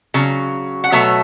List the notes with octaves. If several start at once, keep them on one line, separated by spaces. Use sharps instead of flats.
C#3 F#3
F#5
B2 F#3 A3 C#5 E5